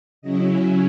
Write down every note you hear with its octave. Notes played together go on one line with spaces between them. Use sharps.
C#3 F#3 C#4 E4 D#5
G#5